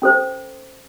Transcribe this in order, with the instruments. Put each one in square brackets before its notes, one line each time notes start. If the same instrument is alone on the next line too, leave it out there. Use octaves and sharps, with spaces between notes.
[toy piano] C#4 A4 C5